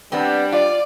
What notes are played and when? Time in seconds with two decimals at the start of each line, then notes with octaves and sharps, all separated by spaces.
0.12 G3 B3 C4 D4
0.52 F4 D5